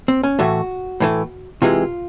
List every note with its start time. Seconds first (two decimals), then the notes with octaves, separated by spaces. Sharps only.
0.08 C4
0.23 C#4
0.39 A2 E3 A3 F#4
1.00 A2 E3 A3
1.62 C3 E3 G#3 F4